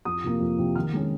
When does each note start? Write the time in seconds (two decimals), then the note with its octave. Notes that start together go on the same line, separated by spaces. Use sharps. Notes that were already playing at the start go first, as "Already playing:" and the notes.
0.05 F2 D#6
0.24 C3 F3 A#3
0.40 F2
0.58 C3 F3 A#3
0.76 D#3 F6
0.93 G#3 C#4